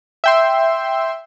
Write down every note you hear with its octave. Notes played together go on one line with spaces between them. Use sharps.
E5 G5 C6